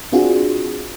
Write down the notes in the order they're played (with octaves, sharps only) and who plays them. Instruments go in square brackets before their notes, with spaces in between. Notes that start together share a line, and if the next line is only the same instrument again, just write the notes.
[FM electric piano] C4 D4 F4 F#4 G#4